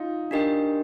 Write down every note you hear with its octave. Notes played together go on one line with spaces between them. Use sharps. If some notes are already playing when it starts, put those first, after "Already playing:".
Already playing: D#4 F4
D4 G4 A#4 D#5 G5